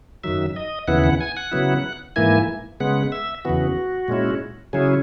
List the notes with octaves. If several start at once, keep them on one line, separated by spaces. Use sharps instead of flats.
F#2 D#3 F#3 E5
D#5
D#2 C#3 E3 B3 E4 F#5
F#5
G#5
F#5
C#3 F#3 B3 E4
G#2 E3 A#3 E4 G#5
C#3 G#3 B3 F#5
E5
E2 C#3 E3 B3 F#4
A#2 G#3 C#4 E4
C#3 F#3 C#4 E4 G#4